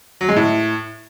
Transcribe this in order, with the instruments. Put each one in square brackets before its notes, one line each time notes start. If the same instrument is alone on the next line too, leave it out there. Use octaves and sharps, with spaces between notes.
[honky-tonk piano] F#3
G#3
A2